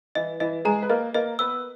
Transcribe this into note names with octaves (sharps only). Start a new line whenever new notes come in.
E3 E4 D#5
E3 E4 D#5
G#3 G#4 A#5
B4
A#3 A#4 D#5
A#3 A#4 D#5
B3 B4 E6